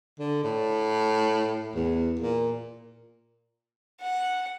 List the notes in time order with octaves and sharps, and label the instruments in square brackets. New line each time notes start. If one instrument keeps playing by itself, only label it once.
[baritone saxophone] D3
A2
E2
A#2
[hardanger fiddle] F#5